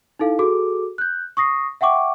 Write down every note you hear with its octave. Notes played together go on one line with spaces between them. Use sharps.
D#4 E4 A4 F5
F#4 G#4 A4 D6
F#6 G6
C#6 D#6 A#6 C7
E5 F#5 G5 C#6 D6